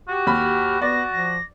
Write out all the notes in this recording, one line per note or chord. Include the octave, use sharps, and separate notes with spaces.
F#4 G4
D#2 B5 F6
B3 F#4 D5 A#6
F3 A#6